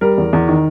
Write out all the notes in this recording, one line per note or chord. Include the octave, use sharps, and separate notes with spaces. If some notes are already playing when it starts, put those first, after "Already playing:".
G3 A#4
E2
E2
D#3